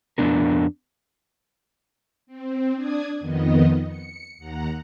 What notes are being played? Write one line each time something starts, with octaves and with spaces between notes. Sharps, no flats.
F2 B3 D4 A#4
C4
D4 D5 D#6 G#6
F2 D#3 B3 D#5
C#7
D#2 F#5 A#5